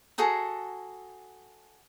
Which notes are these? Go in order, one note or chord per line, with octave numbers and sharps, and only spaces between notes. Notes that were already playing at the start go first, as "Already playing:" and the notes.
F#4 G#4 A4 A#5